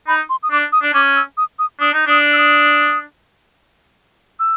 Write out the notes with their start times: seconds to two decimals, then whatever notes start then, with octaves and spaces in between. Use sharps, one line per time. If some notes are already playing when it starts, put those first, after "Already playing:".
0.08 D#4 B5
0.30 C6
0.43 D#6
0.51 D4 D6
0.73 D#6
0.82 D4
0.94 C#4 D6
1.16 E6
1.37 D#6
1.59 D#6
1.80 D4 D#6
1.94 D#4
2.07 D4 D#6
2.33 E6
2.38 D#6
4.40 E6